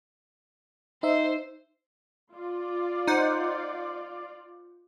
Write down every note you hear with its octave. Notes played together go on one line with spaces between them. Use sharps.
D#4 C5 E5
F4 D5
D#4 C5 F#5